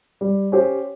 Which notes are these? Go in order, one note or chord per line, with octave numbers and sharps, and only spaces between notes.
G3
C#4 G4 C5